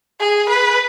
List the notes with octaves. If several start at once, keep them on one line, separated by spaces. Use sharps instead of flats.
G#4
B4